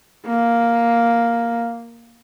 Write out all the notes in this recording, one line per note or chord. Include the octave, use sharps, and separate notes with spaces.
A#3